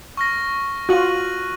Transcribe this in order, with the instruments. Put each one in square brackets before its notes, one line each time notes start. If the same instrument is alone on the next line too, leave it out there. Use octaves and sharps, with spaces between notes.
[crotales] C#6 F6 A#6
[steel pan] F4 F#4 [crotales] F#6 D#7 F#7